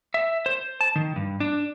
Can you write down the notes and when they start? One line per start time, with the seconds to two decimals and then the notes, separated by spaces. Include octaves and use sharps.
0.14 E5
0.46 C5
0.81 A5
0.96 D#3
1.16 G2
1.40 D4